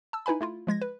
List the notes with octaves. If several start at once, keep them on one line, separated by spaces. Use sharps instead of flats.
A5 E6
D#4 E4 B4 G#5 B5
A3 E4 F4
F3 G#3 G#6 A#6
B4